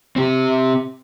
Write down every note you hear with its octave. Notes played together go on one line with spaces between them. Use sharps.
C4 G4